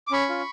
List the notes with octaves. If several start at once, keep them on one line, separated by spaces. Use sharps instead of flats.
D6
C#4 B5 C#6
F4